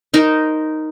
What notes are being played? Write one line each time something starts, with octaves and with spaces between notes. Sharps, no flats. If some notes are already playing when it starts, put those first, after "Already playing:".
D#4 A#4 C5